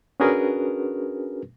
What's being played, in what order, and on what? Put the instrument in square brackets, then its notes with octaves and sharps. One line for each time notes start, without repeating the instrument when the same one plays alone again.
[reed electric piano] C#4 D4 F#4 G#4 A#4 B4